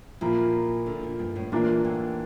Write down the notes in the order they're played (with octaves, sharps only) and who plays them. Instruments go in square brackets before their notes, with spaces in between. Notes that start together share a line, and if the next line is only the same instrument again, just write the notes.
[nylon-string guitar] A#2 [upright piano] F3 A#3 E4
[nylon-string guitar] D3
A#2
G2
A2
[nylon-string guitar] A#2 [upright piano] E3 A#3 D4 F4
[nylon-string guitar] A2